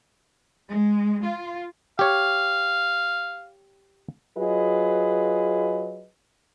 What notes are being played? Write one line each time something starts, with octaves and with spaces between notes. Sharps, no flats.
G#3
F4
G4 C#5 F5
F#3 F4 G#4 B4 D#5